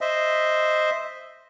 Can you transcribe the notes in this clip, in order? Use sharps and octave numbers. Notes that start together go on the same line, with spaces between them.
C5 D#5 E5